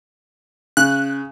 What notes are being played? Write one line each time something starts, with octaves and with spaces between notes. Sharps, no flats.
C#3 F#6